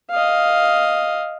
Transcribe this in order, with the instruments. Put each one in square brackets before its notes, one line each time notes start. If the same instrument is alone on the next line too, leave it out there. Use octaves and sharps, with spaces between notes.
[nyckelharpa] D#5 F5